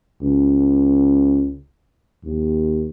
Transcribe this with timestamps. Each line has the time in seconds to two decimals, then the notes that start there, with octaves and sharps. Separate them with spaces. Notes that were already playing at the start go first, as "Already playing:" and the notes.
0.22 C#2
2.24 D#2